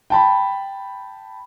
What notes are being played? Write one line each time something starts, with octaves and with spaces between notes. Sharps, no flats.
G5 A5 B5